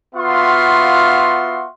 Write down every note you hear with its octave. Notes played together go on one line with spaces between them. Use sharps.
B3 F4 F#4 E5 F5 C6